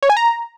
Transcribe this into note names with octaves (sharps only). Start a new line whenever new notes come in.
C#5
G#5
A#5